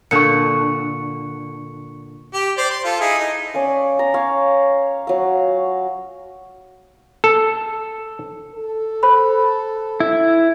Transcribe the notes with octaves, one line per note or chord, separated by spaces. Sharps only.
A#2 D3 C#6 C#7
G4
C5 D5
C6
F4 A4
D#4 E4 G#4
D#4
C#4 D5 F5
A#5
C#5 F5
F#3 F5
A4
A4
C5 B5
E4